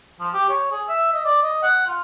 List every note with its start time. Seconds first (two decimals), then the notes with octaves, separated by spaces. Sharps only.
0.20 F3
0.34 G4
0.49 C#5
0.71 G#4
0.88 E5
1.13 D#5
1.25 D5
1.43 D#5
1.63 F#5
1.86 F4